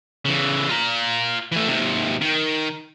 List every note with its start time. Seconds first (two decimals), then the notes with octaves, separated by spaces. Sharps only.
0.25 C#3 E3
0.70 F4 A#5
1.52 E3 A3
1.68 D#2 C3
2.22 D#3